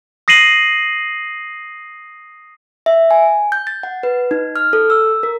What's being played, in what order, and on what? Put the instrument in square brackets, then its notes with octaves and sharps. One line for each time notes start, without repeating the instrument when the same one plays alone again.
[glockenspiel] D#6 A#6 C7 D#7 F#7
[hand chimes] E5
G#5
G6
A6
F#5
B4
D#4
F6
A4
E6
A#4